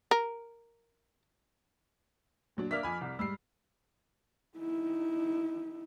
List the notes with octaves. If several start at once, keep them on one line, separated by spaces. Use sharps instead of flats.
A#4
A#2 F#3 D4
A#3 D4 E5 D6 F6 B6
F2 G#5 B5
C2
G#2 G3 E6 C7
D#4 E4